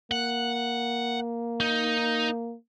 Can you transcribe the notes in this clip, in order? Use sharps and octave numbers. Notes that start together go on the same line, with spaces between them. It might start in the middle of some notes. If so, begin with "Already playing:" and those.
A#3 F#5
D#4